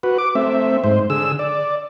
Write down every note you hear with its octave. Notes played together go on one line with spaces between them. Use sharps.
F#4 B4
D6
A3 C4 E5
G#2 C5
D3 G#4 E6
D5